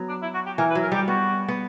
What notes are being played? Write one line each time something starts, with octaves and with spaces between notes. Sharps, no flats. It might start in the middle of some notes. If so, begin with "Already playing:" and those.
Already playing: F#3 B3
D4
E4
F#4
G4
E3 A#4
B4
F#3
A#4
G3 G4
B3 F#4
B3